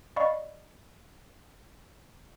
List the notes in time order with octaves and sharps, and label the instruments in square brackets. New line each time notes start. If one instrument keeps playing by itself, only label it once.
[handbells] D5 D#5 F5 B5 C#6